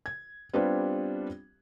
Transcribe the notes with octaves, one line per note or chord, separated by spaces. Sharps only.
G#6
G3 B3 C4 D4 F4 G4